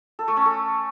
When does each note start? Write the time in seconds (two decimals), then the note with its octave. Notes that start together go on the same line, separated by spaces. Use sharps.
0.19 A4
0.28 A3
0.37 C#4
0.46 A4